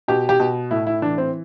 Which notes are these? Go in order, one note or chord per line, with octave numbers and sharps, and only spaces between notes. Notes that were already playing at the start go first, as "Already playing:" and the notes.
B2 G4
G4
B2
A2 E4
E4
E3 D4
C4